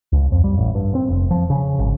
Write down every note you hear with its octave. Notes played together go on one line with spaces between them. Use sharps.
C#2
F2
G3
A1
G2
C4
F1
F3
C#3
G#1